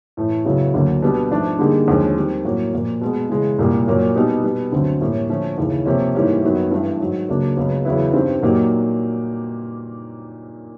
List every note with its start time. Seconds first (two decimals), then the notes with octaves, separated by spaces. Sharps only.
0.17 A2 E3 A3
0.45 C#2 C#3 F#3 B3 E4
0.74 D2 D3 F#3 A#3
1.02 B2 G3 B3 D4 G4
1.31 G#2 F3 A3 D4
1.59 D3 G3 A#3 D#4 G#4
1.88 D#2 D3 F3 G#3 C#4
2.16 D#3 G3 C4
2.45 A2 F#3 A#3 C#4 F#4
2.73 A#2 F3 A#3
3.01 B2 G#3 B3
3.29 C#3 E3 G#3
3.59 C2 A#2 G3 A#3
3.87 A#2 F#3 A#3 C#4
4.15 B2 G3 B3 D#4 G4
4.43 B2 G3 B3
4.72 D2 D3 F#3 A3 C4
5.01 A2 E3 G3 A#3 C#4
5.29 D3 F3 A3 C#4
5.58 D#2 C#3 E3
5.85 C3 F3 A#3 C#4
6.15 G#2 E3 G3 A#3 C#4
6.43 F#2 D#3 F#3 B3
6.71 G2 E3 A3
7.00 G#2 D#3 F#3
7.28 C#2 C#3 F#3 A#3 D4
7.57 C#2 C#3 F#3 B3
7.85 E2 C#3 F#3 B3 E4
8.13 G2 D#3 G3 C4
8.42 A#2 F#3 A#3 D#4 G4